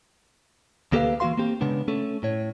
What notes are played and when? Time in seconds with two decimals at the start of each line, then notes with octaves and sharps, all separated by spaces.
0.92 D2 A#3 G4 A4 B4 F5
1.20 E3 A#3 F4 F#4 F5 C6
1.38 A#3 C4 G4
1.61 C#3 G#3 B3 D4
1.88 A3 C#4 A4
2.23 A2 C#5